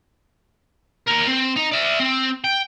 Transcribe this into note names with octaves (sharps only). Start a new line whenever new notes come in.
D#2 A#4
C4
D#4
D5 E5
C4
G5